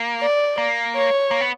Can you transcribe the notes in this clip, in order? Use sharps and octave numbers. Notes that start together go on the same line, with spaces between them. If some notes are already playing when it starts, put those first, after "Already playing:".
Already playing: A#3
D5
A#3
C#5
A#3
B3